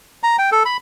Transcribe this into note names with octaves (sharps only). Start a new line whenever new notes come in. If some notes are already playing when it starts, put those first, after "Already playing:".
A#5
G5
A4
B5